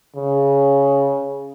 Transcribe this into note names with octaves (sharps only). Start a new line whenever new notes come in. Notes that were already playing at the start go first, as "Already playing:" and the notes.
C#3